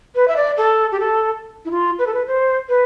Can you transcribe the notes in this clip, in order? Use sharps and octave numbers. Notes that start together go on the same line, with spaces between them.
B4
E5
D5
A4
G4
A4
E4
F4
B4
A4
B4
C5
B4